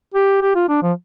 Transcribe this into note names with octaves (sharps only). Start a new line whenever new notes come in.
G4
G4
F4
D4
F3